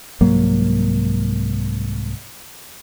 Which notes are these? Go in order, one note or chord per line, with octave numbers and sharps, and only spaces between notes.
C2 G#2 F#3 A#3